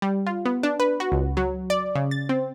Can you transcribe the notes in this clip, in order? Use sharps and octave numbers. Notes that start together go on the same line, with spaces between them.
G3
F4
B3
D4
B4
F#4
C#2
F#3
D5
C#3
A6
C4